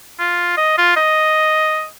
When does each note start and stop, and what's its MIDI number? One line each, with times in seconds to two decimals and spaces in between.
0.19 0.53 65
0.57 0.76 75
0.78 0.95 65
0.96 1.85 75